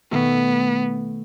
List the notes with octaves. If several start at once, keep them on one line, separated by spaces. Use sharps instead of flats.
B2 D#3 A3 B3